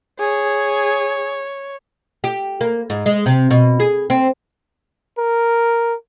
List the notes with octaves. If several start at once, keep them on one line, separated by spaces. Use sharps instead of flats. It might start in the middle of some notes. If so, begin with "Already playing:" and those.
G#4 C#5
G4
A#3
G#2
G#3
C3
B2
G#4
C4
A#4